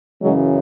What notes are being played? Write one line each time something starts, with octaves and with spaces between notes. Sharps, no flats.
F#2 C#3 E3 F#3 G#3